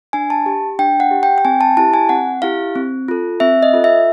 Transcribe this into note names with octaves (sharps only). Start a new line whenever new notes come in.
D4 G#5
A5
G4
D4 G5
F#5
G4
G5
G5
C4 G#5
A5
E4 G4 A5
G#5
C4 F#5
E4 G4 F5
C4
F4 A4
C4 E5
D#5
F4 A4
E5